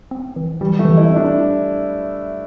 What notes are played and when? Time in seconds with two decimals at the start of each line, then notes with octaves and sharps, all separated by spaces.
0.11 C4
0.36 E3
0.61 E3 G3
0.79 A3
0.85 E3
0.97 E4
1.10 C4
1.16 D4